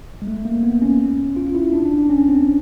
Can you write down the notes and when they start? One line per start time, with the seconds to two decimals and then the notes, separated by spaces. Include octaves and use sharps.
0.22 G#3
0.27 A3
0.45 A#3
0.63 B3
0.82 C#4
1.36 F4
1.55 E4
1.73 D4
1.85 D4
1.98 D4
2.09 C#4
2.28 C4